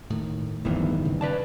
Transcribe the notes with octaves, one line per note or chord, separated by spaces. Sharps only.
A2 D#3
D1 G2 D#3 E3 B3
C#3
B4 D5 A5